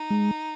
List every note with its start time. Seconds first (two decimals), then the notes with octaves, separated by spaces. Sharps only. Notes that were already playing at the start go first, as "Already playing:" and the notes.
Already playing: D#4
0.10 G#3